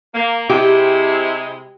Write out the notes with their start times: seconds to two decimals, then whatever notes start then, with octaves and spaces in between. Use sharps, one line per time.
0.15 A#3
0.50 C3 G#3 E4 G4